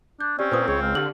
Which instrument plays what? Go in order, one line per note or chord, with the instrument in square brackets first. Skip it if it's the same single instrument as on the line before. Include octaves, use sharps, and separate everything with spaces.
[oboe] D4 [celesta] G6
[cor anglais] C4 [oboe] C#4 [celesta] G4 D5
[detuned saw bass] A#2 [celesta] B4 C5 D#6
[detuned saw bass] C#2 [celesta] G#4 [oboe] C#5
[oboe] F5
[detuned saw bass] D3 [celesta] G4 F#7